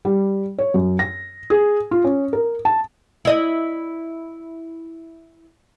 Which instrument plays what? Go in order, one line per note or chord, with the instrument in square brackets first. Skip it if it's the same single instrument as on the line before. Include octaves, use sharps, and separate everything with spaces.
[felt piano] G3
C#5
F#2
A#6
G#4
F4
C#4
A#4
A5
[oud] E4 D#5